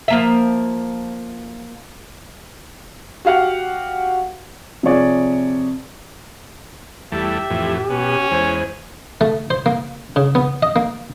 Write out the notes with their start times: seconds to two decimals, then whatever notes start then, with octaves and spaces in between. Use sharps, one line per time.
0.08 F3 A#3 E5
3.25 F#4 G4 F5 F#5
4.83 C3 F3 G#4 C#5 D5
7.12 E2 G3 A3 G4 E5
7.50 F2 A2 E3
7.90 B2 C#4
8.31 E2 G#3 C5
9.21 A3
9.50 C5
9.66 A#3
10.16 C#3
10.35 B3
10.63 D#5
10.76 A#3